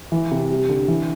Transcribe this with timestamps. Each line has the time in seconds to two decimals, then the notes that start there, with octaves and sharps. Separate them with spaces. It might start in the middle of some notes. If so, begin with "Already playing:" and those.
0.12 E3
0.31 C3
0.50 G3
0.69 D3
0.88 E3